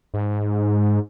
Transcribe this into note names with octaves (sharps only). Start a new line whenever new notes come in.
G#2